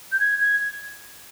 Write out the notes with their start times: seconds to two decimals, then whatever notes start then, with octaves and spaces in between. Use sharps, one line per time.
0.12 G6
0.20 G#6
0.41 G#6